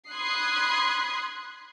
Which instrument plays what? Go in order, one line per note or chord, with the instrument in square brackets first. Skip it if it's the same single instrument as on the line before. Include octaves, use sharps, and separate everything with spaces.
[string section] B5 C6 D#6 F#6 G#6 C7